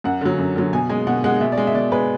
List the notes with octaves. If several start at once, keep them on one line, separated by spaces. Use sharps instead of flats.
F#2 F#5
D3 F#3
F#2
D3 F#3
B2 G#5
G#3 G#5
B2 F#5
G#3 F#5
B2 E5
D5
G#3
E5
B2 D5
G#3 B4